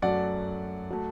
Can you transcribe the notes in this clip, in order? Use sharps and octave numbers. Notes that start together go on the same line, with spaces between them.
F#2 F#3 A3 D5 F#5
F#3 A3